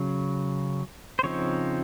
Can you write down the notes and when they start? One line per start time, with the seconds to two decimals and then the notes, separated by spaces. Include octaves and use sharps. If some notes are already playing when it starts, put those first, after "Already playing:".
Already playing: C#3 F#3
1.19 C5
1.23 C#3 F3 C4 D#4 C#5